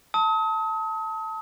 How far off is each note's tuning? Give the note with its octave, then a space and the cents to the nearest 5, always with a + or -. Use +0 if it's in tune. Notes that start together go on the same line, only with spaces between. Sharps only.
A5 +10 D#6 +40